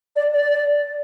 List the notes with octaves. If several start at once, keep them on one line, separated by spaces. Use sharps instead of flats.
D5
D5